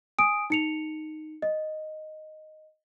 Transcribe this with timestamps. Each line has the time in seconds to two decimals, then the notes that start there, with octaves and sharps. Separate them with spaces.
0.19 G#5 D#6 D7
0.50 D#4 C#7 F7
1.42 D#5